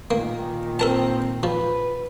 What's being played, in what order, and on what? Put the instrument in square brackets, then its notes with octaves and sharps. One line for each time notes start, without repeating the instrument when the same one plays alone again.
[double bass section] A#2 D#3 [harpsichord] A#3
[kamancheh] C4 [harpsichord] A4 A#4 A5
[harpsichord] F3 [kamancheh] B4